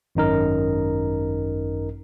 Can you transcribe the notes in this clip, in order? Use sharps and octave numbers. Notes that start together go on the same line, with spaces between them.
G#1 F#2 D#4 A#4